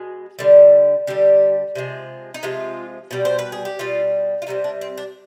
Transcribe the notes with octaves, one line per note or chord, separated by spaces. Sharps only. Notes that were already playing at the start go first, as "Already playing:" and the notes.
Already playing: B2 G#3
D3 G3
D3 G3 G4
C3 F3 G#3
D#4
C3 F3 G#3 F4
B2 G3
C5
B4
G#4
G4
B2 G3 F4
F4
C3 D#3 G3 D#4
D4
C4
D4